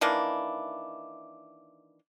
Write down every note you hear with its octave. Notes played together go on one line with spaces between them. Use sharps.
D#3 E3 A#3 D4